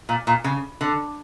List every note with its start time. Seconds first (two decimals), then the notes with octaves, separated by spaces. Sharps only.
0.09 A#2
0.27 A#2
0.44 C#3
0.81 D3